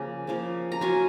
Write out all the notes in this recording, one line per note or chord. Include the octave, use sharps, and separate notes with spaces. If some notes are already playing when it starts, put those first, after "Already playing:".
Already playing: C#3 F3 A#3 G#5 A#5
C#3 F3 A#3
A#5
F#3 C#4 F4 G#5